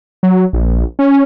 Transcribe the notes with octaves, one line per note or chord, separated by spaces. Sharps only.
F#3
A#1
C#4